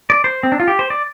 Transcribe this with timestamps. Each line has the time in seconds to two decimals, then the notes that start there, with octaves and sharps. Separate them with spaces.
0.10 D5
0.24 C5
0.43 C4
0.52 D4
0.60 F4
0.68 G4
0.79 C5
0.90 D5